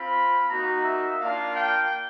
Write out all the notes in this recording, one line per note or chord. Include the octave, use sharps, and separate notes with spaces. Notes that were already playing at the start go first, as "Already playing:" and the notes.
Already playing: C4 F4 B5
A#3 D#4 F#4 A#5
E5
A#3 D4 F4 F5
G5